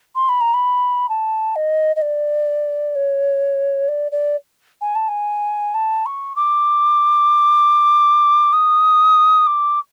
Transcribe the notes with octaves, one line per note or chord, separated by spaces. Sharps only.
C6
B5
A#5
B5
A5
D#5
D#5
D5
C#5
D5
D5
G#5
A5
G#5
A5
C#6
D6
D#6
D6